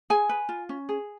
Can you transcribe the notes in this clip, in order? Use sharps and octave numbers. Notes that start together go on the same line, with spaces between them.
G#4 G#5
B4
F4
C#4
G#4